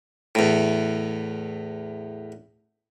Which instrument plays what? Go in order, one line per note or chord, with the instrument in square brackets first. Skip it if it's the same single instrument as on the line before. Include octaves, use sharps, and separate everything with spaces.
[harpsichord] E2 A2